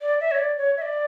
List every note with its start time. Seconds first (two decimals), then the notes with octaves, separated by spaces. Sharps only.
0.01 D5
0.20 E5
0.31 C#5
0.39 D5
0.58 C#5
0.77 E5
0.82 D5